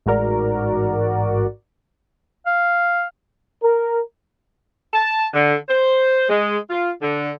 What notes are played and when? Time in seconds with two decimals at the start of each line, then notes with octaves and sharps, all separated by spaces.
0.06 A1 G#2 F#4 A#4 D5
2.46 F5
3.63 A#4
4.94 A5
5.33 D3
5.69 C5
6.29 G#3
6.70 F4
7.01 D3